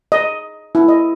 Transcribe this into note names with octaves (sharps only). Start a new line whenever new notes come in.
D#5
E4
D#5